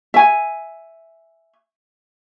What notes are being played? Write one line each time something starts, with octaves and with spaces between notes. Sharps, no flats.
E5 G#5